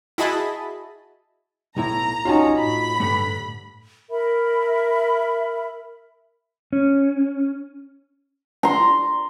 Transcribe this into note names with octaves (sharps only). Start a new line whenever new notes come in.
E4 F#4 G#4 D#5 A5 B5
B1 A2 E4 A#5
C#4 D#4 F4 F#4 A5
A2 B5
G2 D3 A3
A#4 E5 B5
C#4
A#5 C6